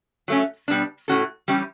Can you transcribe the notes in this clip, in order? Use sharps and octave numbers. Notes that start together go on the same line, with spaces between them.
F#3 A3 C#4
B2 G3 B3 D4
A2 G3 C#4 F#4 A4
E3 G3 C#4 G4